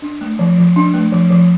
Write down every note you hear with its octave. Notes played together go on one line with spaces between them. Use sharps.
D4
A3
F3
F3
D4
A3
F3
F3